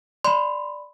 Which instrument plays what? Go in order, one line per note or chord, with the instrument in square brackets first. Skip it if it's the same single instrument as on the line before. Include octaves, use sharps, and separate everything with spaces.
[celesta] D5 B5 [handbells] C6